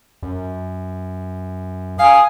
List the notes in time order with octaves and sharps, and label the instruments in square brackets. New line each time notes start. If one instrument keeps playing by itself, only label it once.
[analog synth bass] F#2
[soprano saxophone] F5 [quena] G#5 [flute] D#6